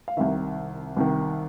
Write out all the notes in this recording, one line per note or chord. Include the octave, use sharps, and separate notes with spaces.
F5
C2 C3 D#3 E5
C2 C3 D#3